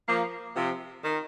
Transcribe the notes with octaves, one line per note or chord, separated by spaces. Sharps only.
F3 A#3
C3 F3
D#3